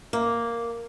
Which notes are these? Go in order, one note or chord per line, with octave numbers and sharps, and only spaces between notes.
A#3